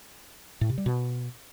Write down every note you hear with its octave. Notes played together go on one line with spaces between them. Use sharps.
A2
C3
G3
B2